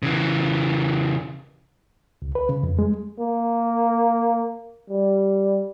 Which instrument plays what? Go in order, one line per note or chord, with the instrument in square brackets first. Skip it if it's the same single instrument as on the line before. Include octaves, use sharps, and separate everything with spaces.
[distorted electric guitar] C#3 E3
[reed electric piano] C#2
B4
C#3
F2
G#3
[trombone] A#3
G3